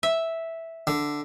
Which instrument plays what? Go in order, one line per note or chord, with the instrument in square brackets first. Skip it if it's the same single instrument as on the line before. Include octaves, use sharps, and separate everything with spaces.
[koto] E5
[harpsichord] D3